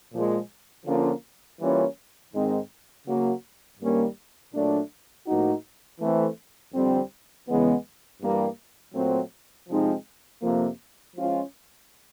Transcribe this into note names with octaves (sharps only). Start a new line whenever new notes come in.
A#2 F3 G#3
D3 F3 A#3 C#4 F4
E3 G3 A#3 C#4 F4
G#2 D#3 G#3 C4 D#4
C#3 F#3 A#3
G2 D#3 G3 A#3 C#4
A#2 F#3 A3 D4
A2 F3 A#3 D#4 F#4
E3 A3 C4
F2 D3 G3 C4
E2 C#3 E3 G#3 B3
G2 E3 G3 A#3
A#2 F#3 A3 C4
C3 F3 G#3 C4 D#4
F2 C3 F3 A#3
F3 G#3 C#4 F4